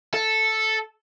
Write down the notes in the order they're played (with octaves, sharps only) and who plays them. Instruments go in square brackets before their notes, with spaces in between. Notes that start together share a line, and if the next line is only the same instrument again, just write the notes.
[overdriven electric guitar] A4